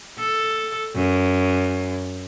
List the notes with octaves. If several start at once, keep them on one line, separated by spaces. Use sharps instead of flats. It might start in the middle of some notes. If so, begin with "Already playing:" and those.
A4
F#2